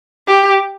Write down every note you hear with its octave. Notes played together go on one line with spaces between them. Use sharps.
G4